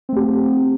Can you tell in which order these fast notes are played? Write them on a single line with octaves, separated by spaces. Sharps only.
C4 A3 G4